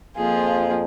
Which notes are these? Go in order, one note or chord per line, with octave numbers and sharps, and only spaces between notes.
F2 F3 A#3 F4 G#4